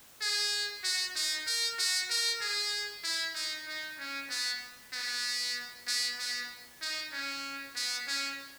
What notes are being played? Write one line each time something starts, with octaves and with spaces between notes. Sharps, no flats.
G#4
F#4
D#4
A#4
F#4
A#4
G#4
E4
D#4
D#4
C#4
B3
B3
B3
B3
D#4
C#4
B3
C#4